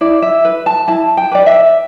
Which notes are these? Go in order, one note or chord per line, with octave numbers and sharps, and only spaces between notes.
E4 D5
E5
B4
A5
E4 A5
G5
B4 D5
E5